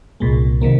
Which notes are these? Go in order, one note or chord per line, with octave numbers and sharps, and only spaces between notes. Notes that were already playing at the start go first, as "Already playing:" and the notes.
C2 A#2 G#3
C3 D#3 A#3